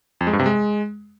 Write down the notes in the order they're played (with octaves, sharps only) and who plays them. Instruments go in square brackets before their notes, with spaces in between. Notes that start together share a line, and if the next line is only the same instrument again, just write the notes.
[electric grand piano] F2
G#3
G2
C3
G#3